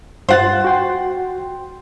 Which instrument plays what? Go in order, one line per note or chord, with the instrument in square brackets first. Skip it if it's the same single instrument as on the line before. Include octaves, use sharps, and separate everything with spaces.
[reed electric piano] G2 F4 A6 [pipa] C5 F#5
[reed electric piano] F#4 G5 C6